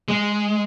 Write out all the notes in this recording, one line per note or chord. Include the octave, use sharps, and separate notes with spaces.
G#3